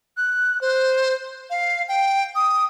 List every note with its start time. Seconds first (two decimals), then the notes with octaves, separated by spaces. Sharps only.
0.17 F#6
0.61 C5
1.50 F5
1.88 G5
2.36 D#6